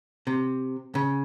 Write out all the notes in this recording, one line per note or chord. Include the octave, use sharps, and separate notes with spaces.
C3
C#3